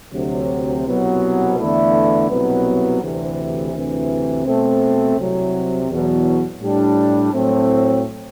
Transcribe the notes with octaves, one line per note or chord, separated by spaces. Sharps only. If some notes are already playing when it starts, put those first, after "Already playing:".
D2 C3 F#3
C2 B2 F#3 B3
E2 D3 A3 E4
C2 B2 F#3 B3
D2 C3 E3
D2 C3 E3
B2 A3 C4
C2 C3 F#3
E2 B2 F#3
A2 G3 D4
A2 F#3 A3 C4